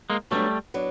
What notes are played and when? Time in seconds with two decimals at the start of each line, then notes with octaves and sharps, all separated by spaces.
0.10 G#3 A#3
0.31 F#3 G3 A3 B3 D4
0.74 F#3 B3 D4